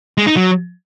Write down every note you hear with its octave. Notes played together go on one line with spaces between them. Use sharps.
G#3
D#4
F#3